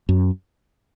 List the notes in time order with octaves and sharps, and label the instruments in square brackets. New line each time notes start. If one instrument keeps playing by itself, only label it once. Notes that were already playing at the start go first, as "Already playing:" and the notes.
[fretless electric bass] F#2